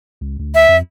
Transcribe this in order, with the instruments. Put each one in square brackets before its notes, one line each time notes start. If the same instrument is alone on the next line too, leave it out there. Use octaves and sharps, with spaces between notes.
[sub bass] C#2
D2
[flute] E5
[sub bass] F2